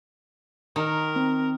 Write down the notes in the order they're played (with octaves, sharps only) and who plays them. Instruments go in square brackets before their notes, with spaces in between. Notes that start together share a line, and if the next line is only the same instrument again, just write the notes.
[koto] D#3 [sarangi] A#4
[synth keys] C4